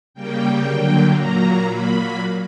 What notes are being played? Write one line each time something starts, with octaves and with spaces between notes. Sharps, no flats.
C#3 G3 A#3 G5
D3 F#3 A#3
A#2 F#3 A#3 A#5
A#2 F#3 A#3 B5